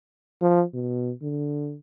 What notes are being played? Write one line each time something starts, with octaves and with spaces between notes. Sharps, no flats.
F3
B2
D3